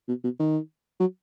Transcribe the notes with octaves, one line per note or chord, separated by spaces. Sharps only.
B2
B2
D#3
F#3